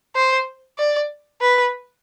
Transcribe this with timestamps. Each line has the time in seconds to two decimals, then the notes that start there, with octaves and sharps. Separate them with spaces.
0.16 C5
0.79 D5
1.42 B4